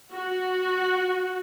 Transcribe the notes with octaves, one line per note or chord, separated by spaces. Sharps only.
F#4